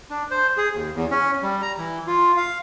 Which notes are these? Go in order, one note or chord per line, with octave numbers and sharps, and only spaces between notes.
D4
C5
G#4
D#2
E2
C#4
G3
A#5
E3
F4
F5